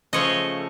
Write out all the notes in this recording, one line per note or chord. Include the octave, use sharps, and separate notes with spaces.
C#3 F3 A3 C#5 D#5